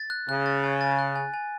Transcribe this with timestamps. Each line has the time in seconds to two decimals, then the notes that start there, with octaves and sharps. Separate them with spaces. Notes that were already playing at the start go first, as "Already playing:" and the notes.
Already playing: A6
0.10 F#6
0.28 C#3 F#6
0.46 A6
0.64 G#5
0.81 A6
0.99 F#6
1.16 G#5
1.34 G#5